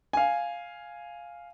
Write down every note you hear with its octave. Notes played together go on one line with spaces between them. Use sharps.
F5 G#5